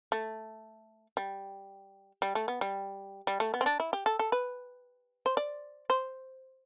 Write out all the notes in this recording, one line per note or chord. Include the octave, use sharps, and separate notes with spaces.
A3
G3
G3
A3
B3
G3
G3
A3
B3
C4
D4
E4
G4
A4
A4
B4
C5
D5
C5